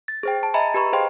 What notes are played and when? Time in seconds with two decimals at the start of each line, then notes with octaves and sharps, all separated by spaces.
0.08 A6
0.23 G#4 C5 G5
0.43 A5
0.54 D#5 E5 G#5 A#5 B5
0.74 G4 B4 A#5 B5 C#6
0.93 G#4 C5 D#5 F5 G5 C6